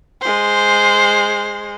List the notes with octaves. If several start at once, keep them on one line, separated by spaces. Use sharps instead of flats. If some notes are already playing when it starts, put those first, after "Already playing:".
G#3 C5